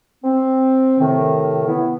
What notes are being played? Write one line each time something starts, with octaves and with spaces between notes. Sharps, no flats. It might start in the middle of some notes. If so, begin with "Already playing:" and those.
C4
A2 C3 D#3
B3 E4